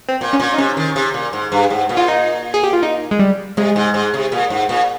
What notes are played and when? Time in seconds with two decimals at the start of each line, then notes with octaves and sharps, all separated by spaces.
0.09 C4
0.21 A#2
0.33 C#4
0.40 A#2
0.54 D#4
0.58 C3 C#4
0.77 D#3
0.96 C3
1.14 A#2
1.33 G#2
1.52 G2
1.70 G#2
1.89 A#2
1.97 F4
2.08 D#4
2.54 G#4
2.63 G4
2.73 F4
2.83 D#4
3.11 G#3
3.19 G3
3.57 C3 G#3
3.76 G#2
3.94 G#2
4.14 C3
4.32 A#2
4.50 G#2
4.69 A#2